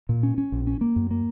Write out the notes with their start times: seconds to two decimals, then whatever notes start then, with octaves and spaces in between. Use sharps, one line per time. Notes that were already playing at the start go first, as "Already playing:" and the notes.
0.09 A#2
0.23 C#4
0.38 C#4
0.52 A#1
0.67 C#4
0.81 A#3
0.96 F#2
1.11 A#3